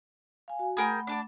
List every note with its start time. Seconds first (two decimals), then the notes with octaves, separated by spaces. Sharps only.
0.48 F5 G#5
0.59 F#4
0.77 A3 G#4 A#4 F#5 G5 B5
1.07 D4 A5 D6